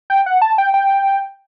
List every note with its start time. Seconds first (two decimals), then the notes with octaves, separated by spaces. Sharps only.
0.10 G5
0.26 F#5
0.42 A5
0.58 G5
0.74 G5